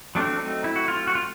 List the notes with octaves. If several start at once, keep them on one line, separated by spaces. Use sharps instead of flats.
F#3 A3 C4 D4
D#4
E4
F#4
F4
F#4
F4